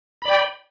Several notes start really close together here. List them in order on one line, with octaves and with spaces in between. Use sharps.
B5 D5 G5